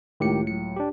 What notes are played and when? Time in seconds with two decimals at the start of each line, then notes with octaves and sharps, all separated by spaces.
0.20 C#2 A2 D#3 G4 C#7
0.47 F#3 C#7
0.76 D4 G4